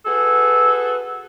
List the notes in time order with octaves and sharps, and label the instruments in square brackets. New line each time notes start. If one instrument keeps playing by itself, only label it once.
[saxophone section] F#4 G#4 A4 B4